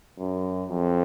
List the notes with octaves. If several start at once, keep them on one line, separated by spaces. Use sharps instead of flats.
F#2
F2